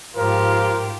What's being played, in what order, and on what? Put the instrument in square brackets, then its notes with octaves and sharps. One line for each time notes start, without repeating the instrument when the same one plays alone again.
[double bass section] G#2 [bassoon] F3 [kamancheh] F4 G4 [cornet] A#4